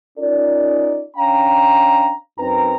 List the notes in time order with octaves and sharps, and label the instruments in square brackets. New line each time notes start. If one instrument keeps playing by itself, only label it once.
[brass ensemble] C#4 D#4 F4 A#4 D5
C#4 D4 F5 G5 A#5
F#2 C4 D#4 B4 A#5